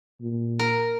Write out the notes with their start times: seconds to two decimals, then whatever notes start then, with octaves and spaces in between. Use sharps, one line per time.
0.21 A#2
0.59 A#4